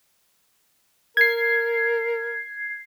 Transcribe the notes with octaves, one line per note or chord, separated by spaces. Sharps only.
A#4 G#6 C7